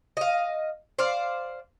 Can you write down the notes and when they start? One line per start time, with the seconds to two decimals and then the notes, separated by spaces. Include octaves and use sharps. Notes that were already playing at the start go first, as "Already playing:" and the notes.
0.17 D#5 F5
0.99 C5 D5 F5